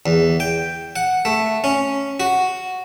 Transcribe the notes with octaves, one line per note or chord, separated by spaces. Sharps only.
E2
G5
F#5
A3
C#4
F#4